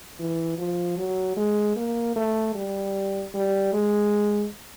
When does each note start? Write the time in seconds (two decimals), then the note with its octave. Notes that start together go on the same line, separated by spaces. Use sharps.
0.20 E3
0.58 F3
0.97 F#3
1.37 G#3
1.76 A#3
2.16 A3
2.55 G3
3.34 G3
3.73 G#3